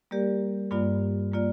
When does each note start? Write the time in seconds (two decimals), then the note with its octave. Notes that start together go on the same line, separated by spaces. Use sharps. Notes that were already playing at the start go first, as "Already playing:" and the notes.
0.11 G3 A#3 G4 A#4 D5
0.71 G2 G3 A#3 F4 D5
1.32 G3 A#3 F4 D5